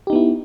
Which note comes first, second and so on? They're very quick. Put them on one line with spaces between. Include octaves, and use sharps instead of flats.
G4 D#4 B3 E4